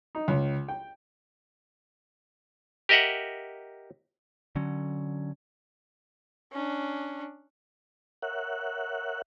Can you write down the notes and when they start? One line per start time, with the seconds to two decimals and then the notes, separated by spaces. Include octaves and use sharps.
0.15 D#4
0.28 C#2
0.68 G5
2.89 G4 A#4 D#5 E5 F#5
4.56 D3 F#3 C#4
6.52 C#4 D4
8.22 A#4 C#5 E5 F#5 F#6